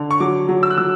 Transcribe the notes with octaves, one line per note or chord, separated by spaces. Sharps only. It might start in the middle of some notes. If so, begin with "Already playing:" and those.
Already playing: D3
C#6
F#3 D6
F#3
E6
F#6
F#3 E6